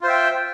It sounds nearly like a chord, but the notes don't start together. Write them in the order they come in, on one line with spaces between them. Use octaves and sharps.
F4 C5 E5 G5